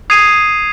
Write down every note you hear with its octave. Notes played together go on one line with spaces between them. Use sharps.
D#6 G#6 C7 D#7